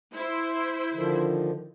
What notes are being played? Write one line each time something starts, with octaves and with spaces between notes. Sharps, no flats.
E4 C5
D3 D#3 F3